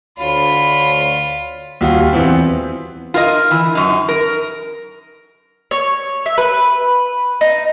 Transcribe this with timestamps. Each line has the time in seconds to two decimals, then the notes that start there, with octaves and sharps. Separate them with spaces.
0.18 D2 F4 C#5 B5
1.81 D#2 G3 F4 F#4
2.13 E2 E3 B3 C4
3.14 F4 A#4 D#5
3.51 E3
3.75 F#2 D#4
4.08 A#4
5.71 C#5
6.26 E5
6.38 B4
7.41 D#4